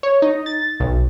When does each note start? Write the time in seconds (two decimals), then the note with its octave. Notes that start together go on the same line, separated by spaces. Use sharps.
0.03 C#5
0.22 D#4
0.46 A6
0.80 B1